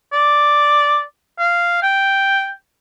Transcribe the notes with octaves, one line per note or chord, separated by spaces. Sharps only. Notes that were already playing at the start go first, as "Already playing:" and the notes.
D5
F5
G5